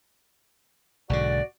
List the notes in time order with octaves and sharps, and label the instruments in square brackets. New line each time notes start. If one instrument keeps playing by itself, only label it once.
[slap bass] B1 G#2 D3 [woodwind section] F#4 D5